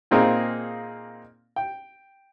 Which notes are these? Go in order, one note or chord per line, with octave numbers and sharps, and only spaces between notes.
A#2 A#3 C4 D#4 G#4
G5